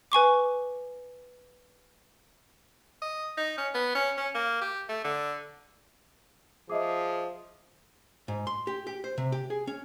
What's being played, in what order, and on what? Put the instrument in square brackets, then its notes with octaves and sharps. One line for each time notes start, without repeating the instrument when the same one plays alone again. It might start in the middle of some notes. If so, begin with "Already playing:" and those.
[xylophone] B4 G#5 C#6 D6
[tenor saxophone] D#5
D#4
C#4
B3
C#4
C#4
A#3
G4
A3
D3
[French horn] F3 [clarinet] G#4 [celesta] D#5 E5 D6
[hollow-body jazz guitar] G#2
C6
G4
G4
C5
C3
G4
G#4
C#4